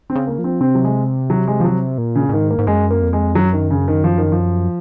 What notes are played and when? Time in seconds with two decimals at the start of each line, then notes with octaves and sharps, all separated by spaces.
0.10 C4
0.16 C#3
0.27 A#3
0.39 F3
0.44 C4
0.61 C3 C4
0.75 F#3
0.84 G#3
1.30 F#3
1.48 G#3
1.60 F3
1.65 F#3
1.98 A#2
2.15 C#3
2.29 A#2
2.32 G#2 D#3
2.51 A#3
2.58 G#2
2.67 F#2 G#3
2.91 A#3
3.02 F2
3.13 G#3
3.35 F#2 F#3
3.53 D#3
3.70 C#3
3.88 D#3
4.04 F3
4.18 D#3
4.32 F3